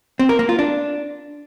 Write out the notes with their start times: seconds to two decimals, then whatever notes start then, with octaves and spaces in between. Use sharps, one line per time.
0.19 C4
0.29 A#4
0.39 A#3
0.49 F4
0.59 D4